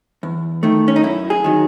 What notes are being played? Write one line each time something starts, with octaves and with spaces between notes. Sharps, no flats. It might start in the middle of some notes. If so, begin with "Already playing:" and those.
E2
D#3 A3
C#4
D#4
F#2 E4
G#4
D#3 F#3